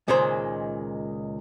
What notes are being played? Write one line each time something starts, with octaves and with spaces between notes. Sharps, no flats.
C#2 A#2 D#3 G#3 C5